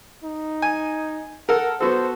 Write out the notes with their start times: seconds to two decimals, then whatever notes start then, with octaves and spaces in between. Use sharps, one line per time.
0.24 D#4
0.62 G#5
1.49 A4 A#4 F#5
1.81 B3 F#4 A4 C5